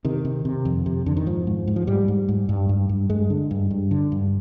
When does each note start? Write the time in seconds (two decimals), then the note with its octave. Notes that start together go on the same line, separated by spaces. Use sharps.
0.05 C3 D#3
0.25 C3
0.45 C3
0.65 F2
0.86 C3
1.06 F2 D3
1.17 D#3
1.26 G#2 F3
1.47 G#2
1.67 G#2
1.76 F3
1.87 G#2 G3
2.08 G#2
2.29 G#2
2.49 G2
2.69 G2
2.89 G2
3.10 G2 G#3
3.30 D3
3.51 G2
3.71 G2
3.91 D3
4.12 G2